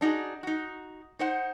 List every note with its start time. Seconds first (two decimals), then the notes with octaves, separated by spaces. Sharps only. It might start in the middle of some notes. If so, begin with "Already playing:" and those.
0.01 D4 D#4 F4 F#4 G#4
0.43 D#4 F#4
1.19 D#4 C5 F#5